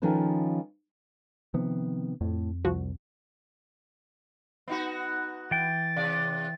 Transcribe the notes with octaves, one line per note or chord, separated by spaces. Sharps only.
D#3 F3 C#4 A4 B4
C3 D#3 F3 B3
F2 A2
C2 F3 F#4
B3 D#4 F#4
E3 G5 A6
C3 D5